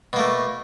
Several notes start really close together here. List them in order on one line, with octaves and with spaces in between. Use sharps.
B2 A#3 A3